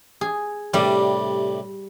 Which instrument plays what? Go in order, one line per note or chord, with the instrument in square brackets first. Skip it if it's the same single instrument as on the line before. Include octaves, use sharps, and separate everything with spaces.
[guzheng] G#4
[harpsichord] A2 C3 D4 [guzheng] G3